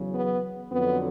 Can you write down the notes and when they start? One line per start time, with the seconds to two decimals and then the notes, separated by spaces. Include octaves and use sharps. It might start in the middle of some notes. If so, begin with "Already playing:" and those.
Already playing: E2 C#3 F#3
0.13 B3
0.72 F2 D3 F#3 B3